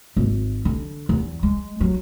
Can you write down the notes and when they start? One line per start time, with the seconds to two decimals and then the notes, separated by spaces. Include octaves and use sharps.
0.17 G#1
0.65 D3
1.09 E2
1.43 G#3
1.80 F#3